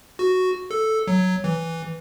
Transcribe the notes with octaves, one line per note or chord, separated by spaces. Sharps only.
F#4
A4
F#3
E3